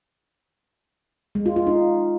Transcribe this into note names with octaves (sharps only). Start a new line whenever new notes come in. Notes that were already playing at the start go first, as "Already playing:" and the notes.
G#3
F4
F4
D#4